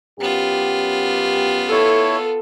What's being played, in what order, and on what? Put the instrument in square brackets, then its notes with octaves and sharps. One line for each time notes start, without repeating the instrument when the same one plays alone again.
[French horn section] F#2 C#4 G4 [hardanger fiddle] B3 F4
[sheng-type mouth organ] E4 C#5 [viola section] A4